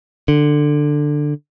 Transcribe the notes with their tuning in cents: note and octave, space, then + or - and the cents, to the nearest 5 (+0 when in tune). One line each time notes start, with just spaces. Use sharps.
D3 +10